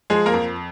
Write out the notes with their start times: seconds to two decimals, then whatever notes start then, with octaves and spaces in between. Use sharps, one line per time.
0.10 F3 G#3 G#4
0.26 A#3 A#4
0.34 F2